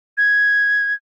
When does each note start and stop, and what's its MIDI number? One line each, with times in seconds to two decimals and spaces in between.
0.18 0.94 92